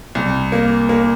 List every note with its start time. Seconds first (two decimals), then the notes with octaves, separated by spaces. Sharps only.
0.15 C2
0.52 A#3
0.89 A#3